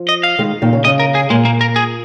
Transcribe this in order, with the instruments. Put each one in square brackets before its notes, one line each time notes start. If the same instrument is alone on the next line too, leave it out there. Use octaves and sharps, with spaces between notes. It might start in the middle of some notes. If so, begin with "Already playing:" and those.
Already playing: [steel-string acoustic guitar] F3
[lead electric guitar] D#5
F5
[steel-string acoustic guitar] D#3 G#3
A#2 D#3
C#3
[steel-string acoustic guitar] C#3 [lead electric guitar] D#5
[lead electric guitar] A#4
G#4
[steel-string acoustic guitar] A#2 [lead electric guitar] G#3
[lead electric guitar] A#3
A#4
G#4